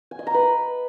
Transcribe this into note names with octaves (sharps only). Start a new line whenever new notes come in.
G#5
D#5
A#5
B4